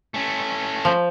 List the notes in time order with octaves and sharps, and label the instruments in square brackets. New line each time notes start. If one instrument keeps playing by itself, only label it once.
[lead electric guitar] A3 C#4
[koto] F3